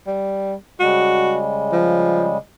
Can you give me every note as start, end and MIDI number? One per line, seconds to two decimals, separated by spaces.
0.07 0.54 55
0.80 2.37 49
0.80 2.37 55
0.80 2.37 56
0.80 1.41 66
1.72 2.30 53